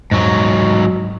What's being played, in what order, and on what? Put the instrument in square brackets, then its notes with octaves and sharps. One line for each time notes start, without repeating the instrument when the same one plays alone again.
[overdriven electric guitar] G#2 F#3